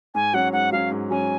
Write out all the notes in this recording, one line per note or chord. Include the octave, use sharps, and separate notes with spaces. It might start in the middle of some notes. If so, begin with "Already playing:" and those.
G#2 G#5
F#3 C#4 F#5
G#2 F#5
F#3 C#4 F5
G#2
F#3 C#4 G#5